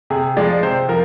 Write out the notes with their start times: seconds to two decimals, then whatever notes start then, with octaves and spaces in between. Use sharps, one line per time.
0.10 C3 G#4
0.36 F3 G#3 D5
0.63 C3 C5
0.89 F3 A#4